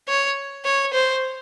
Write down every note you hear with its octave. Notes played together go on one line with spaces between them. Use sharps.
C#5
C#5
C5